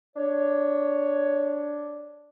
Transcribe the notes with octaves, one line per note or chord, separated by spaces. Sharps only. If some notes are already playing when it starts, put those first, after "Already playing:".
D4 C#5